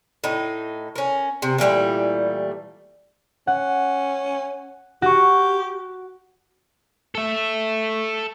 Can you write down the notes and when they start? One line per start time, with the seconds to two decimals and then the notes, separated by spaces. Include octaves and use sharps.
0.24 A2 D#4
0.96 C#4 A#4
1.42 C3
1.58 A#2 E3 G3 A3
3.47 C#4 F#5
5.02 F#4 G4 C#6
7.15 A4 E5